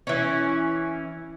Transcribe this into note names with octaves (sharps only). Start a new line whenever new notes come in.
E3 C#4